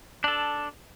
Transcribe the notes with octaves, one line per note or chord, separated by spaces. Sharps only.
D4 A4